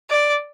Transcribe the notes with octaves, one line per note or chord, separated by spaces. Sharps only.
D5